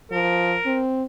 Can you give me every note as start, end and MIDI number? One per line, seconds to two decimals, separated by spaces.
0.11 0.56 53
0.11 0.80 70
0.66 1.04 60